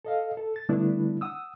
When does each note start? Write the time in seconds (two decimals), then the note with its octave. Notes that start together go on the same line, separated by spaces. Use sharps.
0.05 A4 D#5 F5
0.37 A4
0.56 A6
0.69 D3 G3 A3 B3 D4 E4
1.21 F#5 D#6 E6